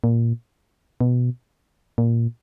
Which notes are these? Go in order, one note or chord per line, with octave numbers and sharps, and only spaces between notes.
A#2
B2
A#2